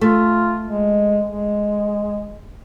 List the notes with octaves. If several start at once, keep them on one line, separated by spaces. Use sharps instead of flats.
A3 F4
G#3
G#3